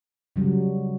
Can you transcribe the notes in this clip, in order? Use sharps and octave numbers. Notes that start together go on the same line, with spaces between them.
C#3 F#3 G3